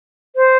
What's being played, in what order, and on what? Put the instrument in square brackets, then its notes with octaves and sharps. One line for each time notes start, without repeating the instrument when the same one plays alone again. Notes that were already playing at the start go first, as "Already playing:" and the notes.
[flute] C5